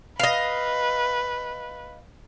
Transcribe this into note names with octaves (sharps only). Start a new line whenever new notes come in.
B4 D#5 F5